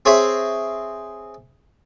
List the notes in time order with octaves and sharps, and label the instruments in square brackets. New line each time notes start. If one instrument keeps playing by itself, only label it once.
[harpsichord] C4 G#4 C#5 E5